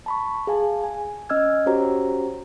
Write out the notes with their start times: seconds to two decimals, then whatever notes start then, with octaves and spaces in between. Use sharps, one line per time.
0.06 A5 B5 C#6
0.47 G#4 F5 G#5 A5
0.84 G#5
1.29 C#4 D#5 E6 F6 G#6
1.66 C#4 F#4 G4 C5 C#5 A#5